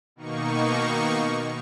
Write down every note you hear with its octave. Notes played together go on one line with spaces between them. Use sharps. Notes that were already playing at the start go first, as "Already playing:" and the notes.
B2 D#3 A#3 D#4 C#6